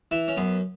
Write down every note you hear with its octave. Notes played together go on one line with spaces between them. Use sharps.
E3 E4
C#4
F#2 B3